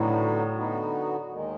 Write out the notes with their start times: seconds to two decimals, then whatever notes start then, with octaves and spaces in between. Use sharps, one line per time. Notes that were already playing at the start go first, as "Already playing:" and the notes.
Already playing: A2 D3 F#3 B3 D#4 F#4
0.57 D3 F#3 B3 D#4 F#4
1.31 D#2 D#3 G#3